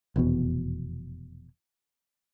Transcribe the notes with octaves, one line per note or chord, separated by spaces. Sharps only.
F1 E2 B2